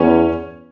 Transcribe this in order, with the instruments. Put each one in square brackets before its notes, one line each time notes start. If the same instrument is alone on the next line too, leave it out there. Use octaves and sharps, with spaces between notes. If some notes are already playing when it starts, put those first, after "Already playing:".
Already playing: [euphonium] E2 [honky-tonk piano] C#4 C#5